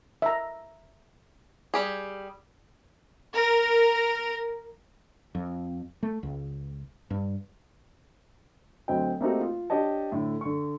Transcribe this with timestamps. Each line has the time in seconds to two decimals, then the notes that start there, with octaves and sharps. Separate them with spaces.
0.22 E5 A#5
1.74 G3 G4 G#4
3.34 A#4
5.35 F2
6.03 A3
6.23 C#2
7.10 G2
8.88 D2 F#3 C4 D#5 G5
9.21 A3 A#3 C4 D#4 F#4 G4
9.41 F4
9.70 D4 G4 C#5 D#5 A5
10.12 A2 D3
10.41 D3 C#6